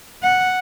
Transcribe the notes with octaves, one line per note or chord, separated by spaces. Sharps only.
F#5